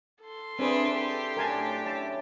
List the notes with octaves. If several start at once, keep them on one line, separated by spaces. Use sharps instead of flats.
A4 C6
C4 D4 E4 G#4 B4 C5
G4
F#2 A2 D4 A#4 G#5 A5
C#3 E4 A5 D6